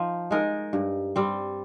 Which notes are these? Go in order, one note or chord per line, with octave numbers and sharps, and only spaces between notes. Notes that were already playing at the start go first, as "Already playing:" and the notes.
Already playing: F3 D#4
G#3 D#4 A#4
G2
G3 C4